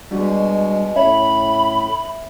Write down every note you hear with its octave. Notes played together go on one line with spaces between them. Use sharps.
B2 G3 G#3 D4 F#4
A2 C#4 C#5 E5 B5